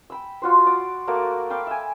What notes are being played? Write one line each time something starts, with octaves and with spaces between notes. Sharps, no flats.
G5 B5 E6
F4 F#4 C5
D5 F#5
A3 A#3 F#4 D5
D5 F5 G5 B5
E5 G#5